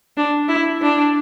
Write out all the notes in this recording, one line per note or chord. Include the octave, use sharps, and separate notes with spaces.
D4
E4
D4